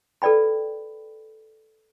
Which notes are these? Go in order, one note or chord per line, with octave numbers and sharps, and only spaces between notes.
A4 B4 D5 G5 B5